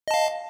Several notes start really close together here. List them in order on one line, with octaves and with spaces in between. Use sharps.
D#5 A5 F5